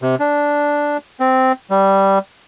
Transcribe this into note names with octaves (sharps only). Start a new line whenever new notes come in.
C3
D4
C4
G3